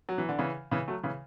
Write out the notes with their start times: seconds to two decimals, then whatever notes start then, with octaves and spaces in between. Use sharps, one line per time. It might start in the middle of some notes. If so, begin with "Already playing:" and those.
0.09 F#3
0.18 E3
0.29 D3
0.39 C#3 E3
0.71 C#3 E3
0.88 F#3 A3
1.03 C#3 E3